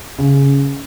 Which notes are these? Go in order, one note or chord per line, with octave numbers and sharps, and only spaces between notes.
C#3